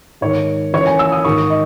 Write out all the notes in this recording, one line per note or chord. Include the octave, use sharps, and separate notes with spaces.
G#2 D#3 C#5
F#2 E3 C#5
G#5
E6
D#6
G#2 D#3 C#6
D#5